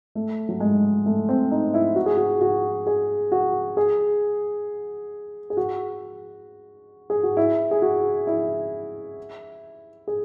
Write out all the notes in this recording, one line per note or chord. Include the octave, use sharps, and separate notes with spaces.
A3
F#3
G#3
A3
C4
D#4
E4
F#4
G#4
F#4
F#4
G#4
F#4
G#4
G#4
F#4
G#4
F#4
E4
G#4
F#4
E4
G#4